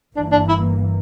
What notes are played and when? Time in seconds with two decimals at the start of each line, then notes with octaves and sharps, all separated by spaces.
0.16 G1 G2 E3 A#3 D4
0.32 D4
0.49 E4